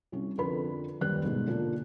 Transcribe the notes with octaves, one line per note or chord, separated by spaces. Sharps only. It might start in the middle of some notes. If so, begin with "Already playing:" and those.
C2 C#4
F2 D3 A#4 B4 B5
D#1 F#2 G3 B4 F#6
G#2 B2
A#2 D3 D4